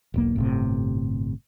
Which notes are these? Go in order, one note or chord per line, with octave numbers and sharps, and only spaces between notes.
E1 B1 A#3
G1 A2 C3